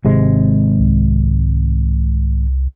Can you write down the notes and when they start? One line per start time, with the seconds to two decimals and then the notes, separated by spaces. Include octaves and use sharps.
0.05 G#1 C3 G#3
0.79 C2